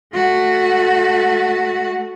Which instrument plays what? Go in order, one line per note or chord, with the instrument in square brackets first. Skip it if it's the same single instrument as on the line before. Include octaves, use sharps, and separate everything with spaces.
[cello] A3 F#4